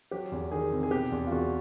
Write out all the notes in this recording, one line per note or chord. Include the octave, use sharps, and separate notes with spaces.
F#3 G4
E2
D#3 G#4
C3
G#4
B2 G4
E2
F4
E2 F#4